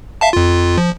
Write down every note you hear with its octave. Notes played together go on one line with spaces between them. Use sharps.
E5 F5 A5
F2 F4
F3